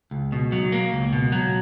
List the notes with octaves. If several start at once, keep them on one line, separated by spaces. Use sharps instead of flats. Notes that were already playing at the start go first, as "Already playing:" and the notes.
C#2
B2
F#3
A#3
C#2
B2
F#3